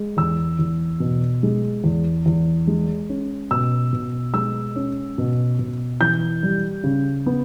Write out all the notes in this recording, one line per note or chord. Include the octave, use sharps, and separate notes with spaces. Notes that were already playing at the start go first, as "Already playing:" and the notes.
Already playing: G#3
E2 E6
E2
B2
G#3
E2
E2
G#3
C#4
B2 E6
B2
G#3 E6
C#4
B2
B2
E3 G6
G3
C#3
B3